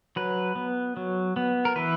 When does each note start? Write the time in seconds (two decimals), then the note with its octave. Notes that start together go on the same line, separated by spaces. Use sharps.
0.16 F#3 B4
0.56 B3
0.97 F#3
1.36 B3
1.65 A#4
1.76 E3 B4